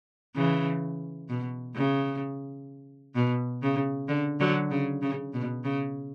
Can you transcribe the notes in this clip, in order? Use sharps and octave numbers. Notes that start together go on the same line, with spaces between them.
C#3 E3
B2
C#3
B2
C#3
D3
D3 F#3
C#3
C#3
B2
C#3